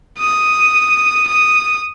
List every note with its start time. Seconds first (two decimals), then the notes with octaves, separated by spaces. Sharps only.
0.18 D#6
1.27 D#6